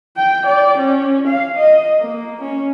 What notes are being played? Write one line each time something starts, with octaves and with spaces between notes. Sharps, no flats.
G5
D5
C#4
F5
D#5
A#3
C#4